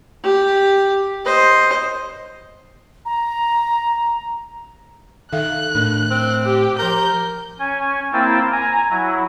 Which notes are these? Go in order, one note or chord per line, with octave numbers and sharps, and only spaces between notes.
G4
C5 D#5
A#5
D#3 A4 E5 F5 F#6
A2 D4 A#4
C4
G4
F3 A#4 D6 G6
C#4 G#5
A#3 C4 E4 G5 A5
G#5 A#5
F#3 E4